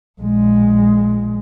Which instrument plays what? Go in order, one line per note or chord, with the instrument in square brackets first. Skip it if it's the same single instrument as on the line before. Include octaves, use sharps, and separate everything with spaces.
[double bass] A#1 G#3